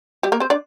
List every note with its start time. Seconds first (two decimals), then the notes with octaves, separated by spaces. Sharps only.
0.23 G3 G4
0.32 A#3 A#4
0.40 C4 C5
0.50 D4 D5